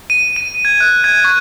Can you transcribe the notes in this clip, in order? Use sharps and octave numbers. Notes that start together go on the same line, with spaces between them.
D#7
D#7
G#6
F#6
G#6
C#6